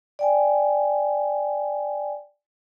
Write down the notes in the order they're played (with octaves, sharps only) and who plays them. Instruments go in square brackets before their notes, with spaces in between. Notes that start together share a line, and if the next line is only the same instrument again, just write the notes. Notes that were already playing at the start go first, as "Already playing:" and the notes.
[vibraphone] D5 G5 G#5